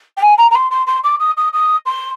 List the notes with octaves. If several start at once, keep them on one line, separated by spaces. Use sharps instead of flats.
G5
G#5
A#5
A#5
C6
C6
C6
D6
D#6
D#6
D#6
C6